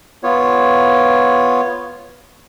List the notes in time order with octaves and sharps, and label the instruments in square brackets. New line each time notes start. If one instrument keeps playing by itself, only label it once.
[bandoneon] B3 F4 C#5